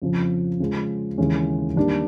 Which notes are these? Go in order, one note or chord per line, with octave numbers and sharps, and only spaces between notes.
F2 C#3 F3
C#3 F3 G#3
D#2 C#3 E3 G#3 C#4
D#3 G3 A#3 D4